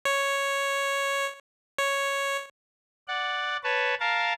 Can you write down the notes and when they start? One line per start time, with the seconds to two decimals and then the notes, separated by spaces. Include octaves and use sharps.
0.05 C#5
1.79 C#5
3.08 D5 F#5
3.64 B4 C#5 A5
4.00 A#4 F5 A5